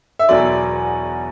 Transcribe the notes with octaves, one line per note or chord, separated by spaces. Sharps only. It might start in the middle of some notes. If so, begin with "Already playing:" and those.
E5
E1 E2 B2 F#3 D5